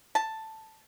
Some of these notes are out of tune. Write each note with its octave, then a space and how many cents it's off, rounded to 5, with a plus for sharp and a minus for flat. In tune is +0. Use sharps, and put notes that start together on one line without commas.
A5 +5